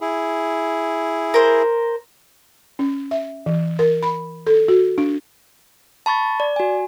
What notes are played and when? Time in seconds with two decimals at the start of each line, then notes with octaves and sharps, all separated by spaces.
0.01 E4 G#4
1.34 A#4 C5
2.79 C#4
3.11 E5
3.46 E3
3.79 A#4
4.03 B5
4.47 A4
4.68 F#4
4.98 D4
6.06 A5 B5 C#6 A6
6.40 D5
6.56 F#4 G#5